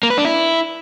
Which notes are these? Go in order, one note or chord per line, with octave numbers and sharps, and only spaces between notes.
A#3
B4
D4
E4